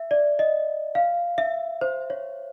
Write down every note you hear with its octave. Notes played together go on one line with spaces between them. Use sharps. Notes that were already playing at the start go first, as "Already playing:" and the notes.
Already playing: E5
D5
D#5
F5
E5
C5
C#5